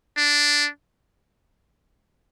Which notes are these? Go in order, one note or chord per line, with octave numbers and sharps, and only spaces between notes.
D4